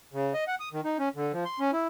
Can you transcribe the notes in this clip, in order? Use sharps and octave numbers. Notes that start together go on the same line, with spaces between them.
C#3
D#5
F#5
D#6
D#3
D#4
C#4
D3
F3
C6
C#4
E4